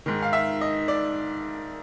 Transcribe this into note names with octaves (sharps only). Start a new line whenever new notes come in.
G#2 D#3
F5
E5
D#5
D5